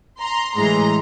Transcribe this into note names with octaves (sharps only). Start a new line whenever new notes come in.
A#5 C6
A2 E3 G#3 A#5 C6